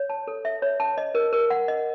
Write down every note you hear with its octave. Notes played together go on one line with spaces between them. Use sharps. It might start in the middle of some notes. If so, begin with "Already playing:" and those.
Already playing: C#5
A5
A4
E5
C#5
A5
D#5
A#4
A#4
F#5
D#5